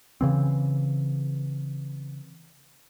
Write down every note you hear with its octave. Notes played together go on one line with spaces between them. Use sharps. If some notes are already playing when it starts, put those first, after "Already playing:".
C#3 E3 C4